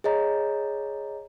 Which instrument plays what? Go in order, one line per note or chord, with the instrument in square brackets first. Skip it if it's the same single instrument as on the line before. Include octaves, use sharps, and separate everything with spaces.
[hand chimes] G#4 C#5 D#5 A#5